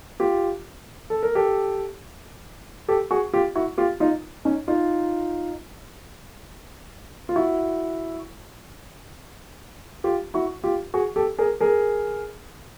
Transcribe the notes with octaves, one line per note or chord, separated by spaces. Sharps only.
F4 G4
A4
A#4
G4 A4
G4 A4
F#4 G#4
F4 G4
E4 F#4
F4 G4
D#4 F4
C#4 D#4
D#4 F4
F4
E4 F#4
F4 G4
E4 F#4
F4 G4
F#4 G#4
G4 A4
G#4 A#4
G#4 A#4